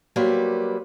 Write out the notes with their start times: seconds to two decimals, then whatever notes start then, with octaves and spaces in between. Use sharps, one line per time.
0.16 F#3 G3 A#3 B4 C5